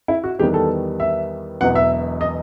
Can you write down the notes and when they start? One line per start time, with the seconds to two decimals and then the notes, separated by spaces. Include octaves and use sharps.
0.08 E4
0.24 F#4
0.39 E2 D#3 G3 B3 G4
0.54 A4
1.00 E5
1.61 E1 E2 B2 F#3 F#5
1.75 E5
2.21 D#5